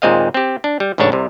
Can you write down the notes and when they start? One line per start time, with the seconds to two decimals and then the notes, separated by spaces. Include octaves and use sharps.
0.02 D#2 A#2 G#3 C4 D#5 F5
0.34 C4 G4
0.64 D4
0.80 G3
0.98 A1 G#2 C#3 D4 C#5 A5
1.12 C2 C3